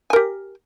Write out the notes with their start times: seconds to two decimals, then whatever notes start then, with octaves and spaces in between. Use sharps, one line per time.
0.10 G#5
0.13 A#4
0.16 G4